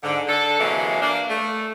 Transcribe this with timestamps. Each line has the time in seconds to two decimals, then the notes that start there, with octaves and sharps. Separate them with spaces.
0.04 G#2 D3
0.28 D3 A4
0.60 C3 E3 F#3 G#3 A#3
1.02 A#3 D4
1.30 A3